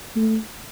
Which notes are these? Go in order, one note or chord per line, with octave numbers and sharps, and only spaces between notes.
A3